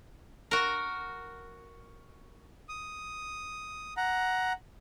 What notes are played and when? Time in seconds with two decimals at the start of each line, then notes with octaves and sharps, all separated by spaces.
0.51 F#4 A#4
2.69 D#6
3.97 F#5 A#5